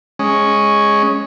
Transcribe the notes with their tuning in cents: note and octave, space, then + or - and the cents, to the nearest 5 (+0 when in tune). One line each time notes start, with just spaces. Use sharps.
G#3 +0 C#4 +0